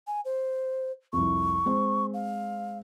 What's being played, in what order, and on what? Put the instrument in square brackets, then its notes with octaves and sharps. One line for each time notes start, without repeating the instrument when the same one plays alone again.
[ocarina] G#5
C5
[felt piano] C2 F2 [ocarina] C#6
[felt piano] G#3 C4 C5
[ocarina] F5